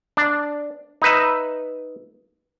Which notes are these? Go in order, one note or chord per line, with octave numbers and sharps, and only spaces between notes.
D4
D#4 B4 E5